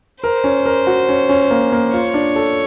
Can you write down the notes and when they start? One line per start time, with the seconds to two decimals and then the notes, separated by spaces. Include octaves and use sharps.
0.23 A#4 C5
0.44 C#4
0.66 A#4
0.87 F#4
1.09 C#4
1.29 C#4
1.50 A#3
1.72 A#3
1.93 F4 C#5
2.14 D4
2.36 A4